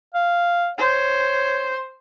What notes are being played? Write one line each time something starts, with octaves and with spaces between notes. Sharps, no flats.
F5
C5 C#5